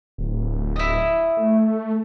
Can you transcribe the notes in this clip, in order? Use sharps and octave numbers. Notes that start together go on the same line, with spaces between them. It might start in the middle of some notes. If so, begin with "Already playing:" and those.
D1
E4 D#5
A3